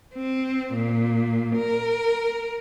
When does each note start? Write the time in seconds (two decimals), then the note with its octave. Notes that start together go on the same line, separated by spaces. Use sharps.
0.15 C4
0.74 A#2
1.57 A#4